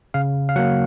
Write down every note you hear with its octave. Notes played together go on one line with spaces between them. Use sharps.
C#3 F5
F5
F#3 A#3 F#5